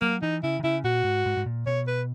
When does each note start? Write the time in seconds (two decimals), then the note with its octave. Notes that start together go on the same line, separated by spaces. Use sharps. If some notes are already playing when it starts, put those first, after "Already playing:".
0.01 F#3 A#3
0.22 E3 D#4
0.43 C#3 E4
0.59 D#3
0.64 C#3 E4
0.84 A#2 F#4
1.04 G#2
1.26 G#2
1.37 G#2
1.46 A#2
1.66 B2 C#5
1.87 B4